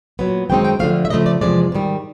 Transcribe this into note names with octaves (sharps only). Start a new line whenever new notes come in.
A#2 F#3 B3
F#2 D#3 G#3 C4 D#4 G5
G5
D3 F3 A3 F5
E5
C#3 F3 A3 D#5
D5
E2 C3 F3 G#3 D5
G#2 D#3 G3